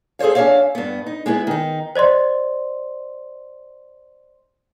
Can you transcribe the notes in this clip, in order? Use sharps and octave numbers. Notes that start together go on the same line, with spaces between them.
G#4 A4 C5 C#5 F5
C#4 D4 C#5 E5 F5
G2 B3
D#4
G#3 B3 E4 B4
D#3 D#4
C5 D5 D#5 C6